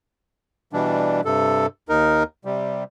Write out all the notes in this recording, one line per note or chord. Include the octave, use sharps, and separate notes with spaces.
B2 E3 G3 D4
G2 C3 A4
D#2 D#4 A#4
C3 G3